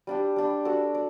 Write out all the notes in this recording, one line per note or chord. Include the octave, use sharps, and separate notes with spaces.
G3 D4 G4
G3 D4 G4
D4 F#4 A4 D5
D5